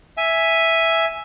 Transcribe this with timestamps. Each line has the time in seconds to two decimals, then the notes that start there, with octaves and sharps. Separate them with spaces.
0.17 E5 G#5